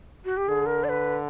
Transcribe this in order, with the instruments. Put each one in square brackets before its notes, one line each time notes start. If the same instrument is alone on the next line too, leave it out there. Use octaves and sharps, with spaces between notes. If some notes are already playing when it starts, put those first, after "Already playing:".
[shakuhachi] F#4
G4
[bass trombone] D3 [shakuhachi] G#4
[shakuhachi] A#4
D5
B4